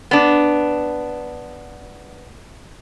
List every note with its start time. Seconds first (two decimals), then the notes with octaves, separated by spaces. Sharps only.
0.11 B3 D4